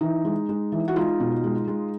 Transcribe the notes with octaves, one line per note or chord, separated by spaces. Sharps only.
E3 D#4
G#3
G#3
E3
F#4
G#3 D#4 F4
B2
G#3
G#3